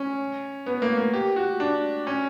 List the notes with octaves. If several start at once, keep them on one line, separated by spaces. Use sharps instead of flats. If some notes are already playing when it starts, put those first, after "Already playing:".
Already playing: C#4
B3
A#3
A#3
G4
F#4
D4
C#4